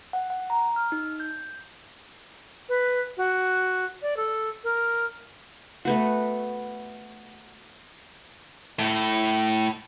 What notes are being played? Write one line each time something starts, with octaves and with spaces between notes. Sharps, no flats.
F#5
F#5
A#5
F6
D#4
G6
B4
F#4
D5
A4
A#4
A3 B3 F#4
A2